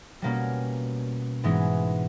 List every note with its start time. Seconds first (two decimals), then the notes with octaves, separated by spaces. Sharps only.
0.22 B2 G3 A#3 C#4
1.44 G#2 E3 G#3 B3